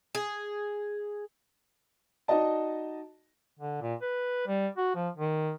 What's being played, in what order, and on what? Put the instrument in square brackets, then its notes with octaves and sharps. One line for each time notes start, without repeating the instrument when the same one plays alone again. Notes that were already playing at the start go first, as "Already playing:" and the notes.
[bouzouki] G#4
[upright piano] D#4 F#4 D5 D#5 A5
[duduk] D3
A#2
B4
G3
F#4
F3
D#3